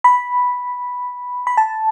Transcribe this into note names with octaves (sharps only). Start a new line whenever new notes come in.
B5
B5
A5